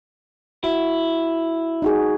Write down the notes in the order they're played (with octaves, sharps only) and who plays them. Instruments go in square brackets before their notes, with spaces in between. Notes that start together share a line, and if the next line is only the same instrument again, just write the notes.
[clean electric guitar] E4 [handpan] F#4
[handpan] D#4 F#4 G#4